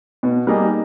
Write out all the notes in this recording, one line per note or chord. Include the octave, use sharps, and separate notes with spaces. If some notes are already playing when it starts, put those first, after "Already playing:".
B2
G3 A#3 D#4 G#4